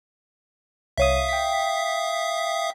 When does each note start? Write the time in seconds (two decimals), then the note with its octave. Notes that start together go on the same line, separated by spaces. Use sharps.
0.98 C2 C#5 E5 F5 D#6 D#7
1.28 G5 B6